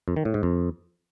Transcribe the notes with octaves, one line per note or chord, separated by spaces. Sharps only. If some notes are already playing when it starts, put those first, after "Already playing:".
F2
D#3
A2
G#2
F2